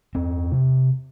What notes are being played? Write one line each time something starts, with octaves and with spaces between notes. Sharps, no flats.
E2 C4
C3